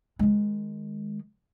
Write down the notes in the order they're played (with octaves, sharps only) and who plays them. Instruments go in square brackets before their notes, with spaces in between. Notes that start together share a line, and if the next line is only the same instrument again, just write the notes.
[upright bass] D#3 G#3